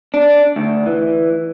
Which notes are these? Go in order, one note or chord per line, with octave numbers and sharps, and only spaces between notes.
D4
D2
E3